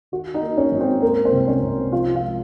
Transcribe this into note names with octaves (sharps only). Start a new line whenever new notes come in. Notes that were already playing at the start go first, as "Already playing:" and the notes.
D#3 F#4
D#4 D#5
A#3
C#4 C#5
G#1
C4 C5
G#3 A#3 A#4
C4 C5
C2
C#4 C#5
C2
F3 F4 F5
F4 F5
G#3